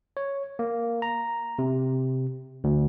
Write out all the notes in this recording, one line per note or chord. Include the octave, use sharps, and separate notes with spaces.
C#5
A#3
A#5
C3
D2